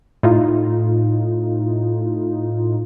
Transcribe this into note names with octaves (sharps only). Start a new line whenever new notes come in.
A2 D#4 F4